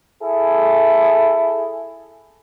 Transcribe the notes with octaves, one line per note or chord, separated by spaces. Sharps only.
E4 G#4 A4